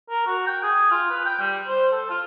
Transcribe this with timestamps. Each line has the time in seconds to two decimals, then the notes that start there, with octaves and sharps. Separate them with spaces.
0.10 A#4
0.26 F#4
0.47 G5
0.63 G#4
0.91 F4
1.10 B4
1.25 G5
1.40 G3
1.68 C5
1.92 A4
2.10 F4